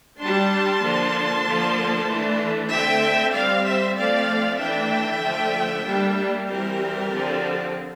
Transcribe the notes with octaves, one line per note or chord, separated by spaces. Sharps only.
G3 D4 A5 C6
D3 F3 A#3 D4
D3 F3 A#3
E3 A3 D4
D3 A3 C4 E5 G5
G3 C4 D5 F5
C5 E5
F3 A3 C4 D5 F5
E3 A3 D4 E5 G5
D3 F3 A3
G3 A#3 D4
E3 G3 C4 G4 A#4
D3 F3 C4